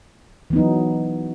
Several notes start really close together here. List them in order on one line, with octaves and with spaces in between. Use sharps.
E3 B3 D#4 F#3